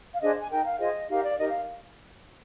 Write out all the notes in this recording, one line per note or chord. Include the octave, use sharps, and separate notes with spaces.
F5
D4 G#4 C5 D#5
G#5
D#4 A#4 G5
F5
F4 G#4 C5 D#5
D#4 G4 A#4 F5
D5
D#4 G4 A#4 D#5
F5